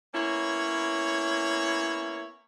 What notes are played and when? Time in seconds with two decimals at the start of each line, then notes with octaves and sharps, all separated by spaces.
0.15 A#3 B3 C#4 E4 C#5